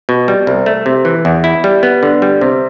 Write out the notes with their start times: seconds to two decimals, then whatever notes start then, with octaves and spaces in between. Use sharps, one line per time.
0.09 B2
0.28 G3
0.47 C2
0.66 A3
0.86 C3
1.05 E3
1.25 E2
1.44 E4
1.64 G3
1.83 B3
2.03 D3
2.22 G3
2.41 C3